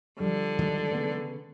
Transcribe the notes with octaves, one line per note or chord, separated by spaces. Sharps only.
D3 F3 G3
D#3 F#3 G#3
C#3 B3 B4